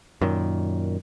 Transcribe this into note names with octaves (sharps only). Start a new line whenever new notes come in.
F#2 A#2 D#3